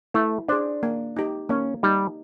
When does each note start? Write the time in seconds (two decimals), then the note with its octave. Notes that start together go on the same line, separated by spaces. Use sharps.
0.14 A3 E4
0.48 D4 G#4 C5
0.83 A#3
1.17 D#4 G4
1.49 A#3 C#4
1.83 G3 D#4 G4